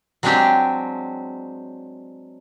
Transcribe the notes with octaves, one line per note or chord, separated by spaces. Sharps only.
F#3 G#3 C4 D4 G4